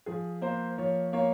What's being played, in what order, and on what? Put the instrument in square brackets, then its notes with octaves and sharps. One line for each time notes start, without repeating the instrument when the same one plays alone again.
[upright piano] F3 G#4
A#3 C5
F3 C#5
A#3 C#5